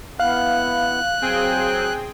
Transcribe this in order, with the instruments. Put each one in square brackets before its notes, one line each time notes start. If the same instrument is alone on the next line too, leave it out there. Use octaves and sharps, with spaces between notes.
[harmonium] B3 E4 F#5 [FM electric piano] F5 [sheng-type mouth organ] F#6
[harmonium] F#3 [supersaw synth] C4 G#4 G5